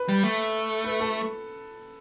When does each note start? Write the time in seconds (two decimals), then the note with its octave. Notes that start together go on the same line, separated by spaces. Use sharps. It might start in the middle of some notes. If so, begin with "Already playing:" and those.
Already playing: B4
0.09 G3
0.24 A3
0.84 B4
1.00 A4